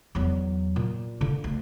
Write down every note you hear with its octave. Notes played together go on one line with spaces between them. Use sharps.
E2 F#3
A#2
D3 F4
D2